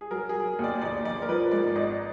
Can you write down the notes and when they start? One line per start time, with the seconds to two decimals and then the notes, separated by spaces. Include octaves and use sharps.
0.01 G#4
0.11 F#3 A#4
0.29 G#4
0.35 F#3
0.59 D#2
0.64 D5
0.81 A#1 D5
1.05 A#1 D5
1.22 A#4
1.29 F3 B4
1.51 G#2 D5
1.75 G#1 D#5